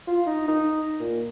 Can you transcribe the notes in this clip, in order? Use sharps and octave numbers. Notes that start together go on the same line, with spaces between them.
F4
D#4
D#4
A#2